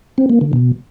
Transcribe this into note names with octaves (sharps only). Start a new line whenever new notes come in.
C4
A#3
D3
B2